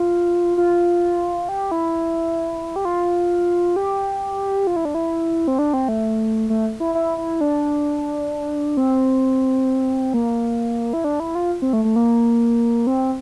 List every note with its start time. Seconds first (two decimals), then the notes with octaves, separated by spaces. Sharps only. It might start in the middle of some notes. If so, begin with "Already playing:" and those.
Already playing: F4
0.57 F4
1.49 G4
1.71 E4
2.76 G4
2.85 F4
3.76 G4
4.67 F4
4.76 E4
4.85 D4
4.95 E4
5.48 C4
5.59 D4
5.73 C4
5.88 A3
6.50 A3
6.80 E4
6.95 E4
7.18 E4
7.41 D4
8.77 C4
10.13 A#3
10.93 E4
11.04 D4
11.20 E4
11.35 F4
11.62 C4
11.73 A3
11.85 A3
11.96 A#3
12.87 C4